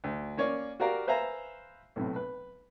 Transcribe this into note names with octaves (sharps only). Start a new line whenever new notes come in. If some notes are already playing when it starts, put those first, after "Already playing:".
D2
A#3 C#4 C#5 D5
F#4 G4 A#4 D5 F5 A#5
B4 C5 E5 F5 G#5 A#5
B1 A2 C3
B4